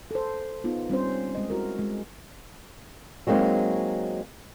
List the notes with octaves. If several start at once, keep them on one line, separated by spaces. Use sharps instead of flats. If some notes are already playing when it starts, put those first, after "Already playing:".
A4 C5
B3 D#4 F4
G3 C4 C#4 C5
G#3 D#5
E4 F#4 A#4
G#3
F#3 G#3 A#3 C4 D#4